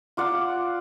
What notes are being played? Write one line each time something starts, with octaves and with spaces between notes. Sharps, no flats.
F4 D5 F#5